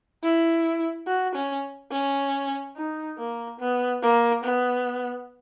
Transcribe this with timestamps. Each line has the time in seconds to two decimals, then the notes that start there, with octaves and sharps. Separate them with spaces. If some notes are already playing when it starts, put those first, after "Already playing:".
0.23 E4
1.07 F#4
1.35 C#4
1.91 C#4
2.76 D#4
3.18 A#3
3.60 B3
4.02 A#3
4.44 B3